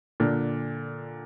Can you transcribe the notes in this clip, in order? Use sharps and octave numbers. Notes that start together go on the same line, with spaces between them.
A#2 D3